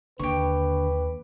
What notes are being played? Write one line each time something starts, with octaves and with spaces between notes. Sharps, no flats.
D#2 D3 G4 B4 C#6